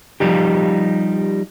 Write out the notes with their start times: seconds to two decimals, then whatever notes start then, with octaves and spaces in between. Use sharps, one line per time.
0.20 F3 G3 D#4 G4